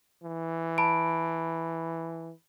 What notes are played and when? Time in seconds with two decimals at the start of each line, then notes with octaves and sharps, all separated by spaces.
0.23 E3
0.78 A5 B5 D7